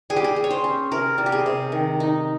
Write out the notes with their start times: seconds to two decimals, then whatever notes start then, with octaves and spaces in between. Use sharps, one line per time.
0.10 G3 G#4
0.16 G4
0.24 G#4
0.36 G3
0.44 C#5
0.51 C5
0.64 C#4
0.91 C3 A#4
1.18 G3
1.26 G4
1.32 G#4
1.46 C3
1.72 D#3
2.00 D#4